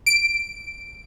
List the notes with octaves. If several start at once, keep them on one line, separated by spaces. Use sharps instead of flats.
D7